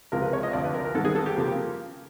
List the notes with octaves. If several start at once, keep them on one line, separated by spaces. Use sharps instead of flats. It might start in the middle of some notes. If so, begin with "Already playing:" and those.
C#2 C3 F3 G#3 A#4
B4
C#5
D#5
D2 C3 F3 D5
B4
A#4
A#4
G#1 G#2 D#3 G3 B3 A4
G#4
A4
G4
C#3 F3 A#3